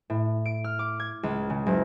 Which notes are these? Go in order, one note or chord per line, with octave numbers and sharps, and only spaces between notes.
A2
D7
F6
D6
G#6
C#2
C#3
F#1